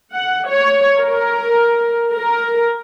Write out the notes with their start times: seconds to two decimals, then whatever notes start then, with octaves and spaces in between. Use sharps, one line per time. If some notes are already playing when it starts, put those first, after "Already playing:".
0.14 F#5
0.48 C#5
1.00 A#4
2.14 A#4